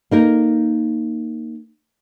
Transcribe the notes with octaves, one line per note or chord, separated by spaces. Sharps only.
A#3 D#4 A#4